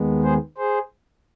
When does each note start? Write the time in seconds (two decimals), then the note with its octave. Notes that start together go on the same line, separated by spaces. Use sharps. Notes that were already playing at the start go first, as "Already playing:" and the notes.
Already playing: D#2 D#3 G#3 B3
0.23 G#4 C5
0.58 G#4 C5